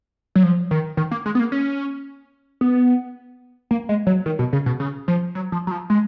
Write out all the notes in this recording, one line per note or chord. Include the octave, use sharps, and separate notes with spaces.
F#3
F3
D#3
D#3
A#3
G#3
B3
A#3
C#4
B3
A#3
G#3
F#3
D#3
B2
C#3
B2
C#3
F3
F#3
F3
F#3
F3
G#3